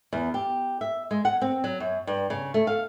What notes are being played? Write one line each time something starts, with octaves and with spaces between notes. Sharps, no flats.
E2
G4
E5
G#3
F#5
C4
F#3
F#2
G2
C#3
A3
F5